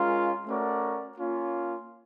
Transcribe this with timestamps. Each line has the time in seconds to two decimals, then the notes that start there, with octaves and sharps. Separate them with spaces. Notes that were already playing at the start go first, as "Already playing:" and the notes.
Already playing: G#3 C#4 F4 A#4
0.47 A3 C#4 F#4 A#4 D5
1.18 A#3 C#4 F4